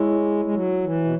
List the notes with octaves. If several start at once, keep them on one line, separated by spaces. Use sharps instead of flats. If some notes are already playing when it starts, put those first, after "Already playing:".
Already playing: G#3 E4 C#5
G#3
F#3
E3
B2